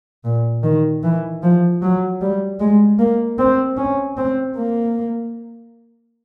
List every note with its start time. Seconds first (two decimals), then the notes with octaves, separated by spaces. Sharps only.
0.24 A#2
0.63 D#3
1.03 E3
1.43 F3
1.82 F#3
2.21 G3
2.60 G#3
2.99 A#3
3.39 C4
3.77 C#4
4.17 C4
4.57 A#3